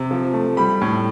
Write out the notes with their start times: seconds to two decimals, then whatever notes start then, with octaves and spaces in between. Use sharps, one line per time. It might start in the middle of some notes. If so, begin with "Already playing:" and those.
Already playing: C3
0.11 F3
0.33 A3
0.57 G3 B5
0.81 A2